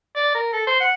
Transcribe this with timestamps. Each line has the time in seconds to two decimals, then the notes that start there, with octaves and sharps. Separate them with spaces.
0.16 D5
0.35 A#4
0.53 A4
0.67 C5
0.80 F#5